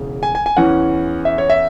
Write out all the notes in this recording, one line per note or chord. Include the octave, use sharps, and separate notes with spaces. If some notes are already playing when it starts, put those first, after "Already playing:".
Already playing: E1 E2 C#3
G#5
G#5
G#5
E2 E3 C#4 F#5
E5
C#5
E5